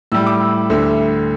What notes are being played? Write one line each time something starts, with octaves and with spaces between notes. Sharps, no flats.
A2 G3 E6
D6
D2 D3 G3 E5